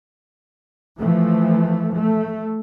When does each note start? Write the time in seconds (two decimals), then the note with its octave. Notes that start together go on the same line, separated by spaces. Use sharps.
1.00 E3 F3 A3
1.97 A3